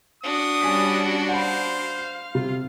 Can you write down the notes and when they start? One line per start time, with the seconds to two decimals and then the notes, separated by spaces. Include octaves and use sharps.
0.23 D4 F#4 D#6
0.62 G3 C#4 G#5 B6
1.29 C5 F5 F#5 B5
2.35 C3 F4